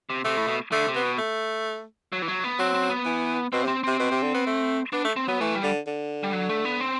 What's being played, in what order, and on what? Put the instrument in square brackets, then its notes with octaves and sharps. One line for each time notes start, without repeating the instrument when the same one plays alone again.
[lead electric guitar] C3
[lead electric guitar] C3 [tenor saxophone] A3
[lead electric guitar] A2
B2
[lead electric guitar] D3 [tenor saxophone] A3
[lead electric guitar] C3
[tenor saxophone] B3
[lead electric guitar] B2
[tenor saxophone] A3
[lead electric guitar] F#3
E3
F#3
B3
[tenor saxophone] F#3 [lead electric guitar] C4
[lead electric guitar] C4
B3
[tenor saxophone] E3
[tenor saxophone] B2 [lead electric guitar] C4
[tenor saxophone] C3
[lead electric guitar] C4
[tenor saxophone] C3 [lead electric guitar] C4
[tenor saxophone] B2
C3
D3
B3
A3
[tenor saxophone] B3 [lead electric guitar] D4
[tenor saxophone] A3
[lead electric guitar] C4
[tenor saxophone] F#3 [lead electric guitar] B3
[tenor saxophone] E3 [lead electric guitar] A3
[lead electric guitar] G3
[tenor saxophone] D3
D3
[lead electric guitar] G3
F#3
A3
B3
C4